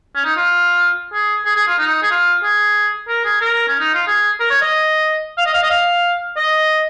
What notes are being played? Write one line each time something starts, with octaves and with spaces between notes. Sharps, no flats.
C#4
D#4
F4
G#4
G#4
G#4
F4
D#4
G#4
F4
G#4
A#4
G#4
A#4
C#4
D#4
F4
G#4
A#4
C#5
D#5
F5
D#5
F5
D#5
F5
D#5